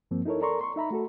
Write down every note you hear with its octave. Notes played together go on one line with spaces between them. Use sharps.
G2 F3 A#3 C4
D#4 E4 A4 A#4 C#5
A4 A#4 D5 A#5 C6 C#6
C6 C#6
D#4 E5 A#5 B5
A3 F#4 A4